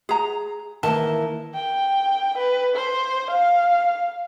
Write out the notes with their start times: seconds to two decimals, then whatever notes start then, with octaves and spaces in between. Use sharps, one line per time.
0.09 G#4 A#5
0.83 D#3 E3 A#3 A5
1.55 G5
2.38 B4
2.76 C5
3.31 F5